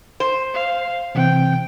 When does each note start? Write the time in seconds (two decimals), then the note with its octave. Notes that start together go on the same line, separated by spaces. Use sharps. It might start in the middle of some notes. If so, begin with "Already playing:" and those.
0.20 C5
0.54 F5
1.15 C3 E3 C4 G5